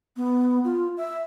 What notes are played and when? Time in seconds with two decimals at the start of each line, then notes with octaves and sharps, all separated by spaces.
0.17 B3
0.64 F4
0.97 E5